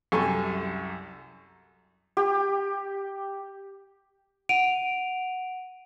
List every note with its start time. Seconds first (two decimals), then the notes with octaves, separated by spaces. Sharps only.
0.12 C2 F#2 G4 A4 G#5 C#6
2.17 G4
4.49 F#5 D7 D#7 F7